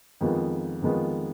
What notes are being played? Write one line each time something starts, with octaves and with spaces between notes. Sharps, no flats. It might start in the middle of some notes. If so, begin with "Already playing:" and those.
F2 D#3 G#3 B3 F4
F2 D#3 G#3 B3 F4